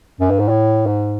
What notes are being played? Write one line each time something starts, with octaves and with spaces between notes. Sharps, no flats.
F#2
G2
G#2
A2
G#2